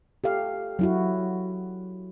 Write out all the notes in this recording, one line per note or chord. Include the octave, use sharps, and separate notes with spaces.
G4 A4 F5
F#3 E4 F#4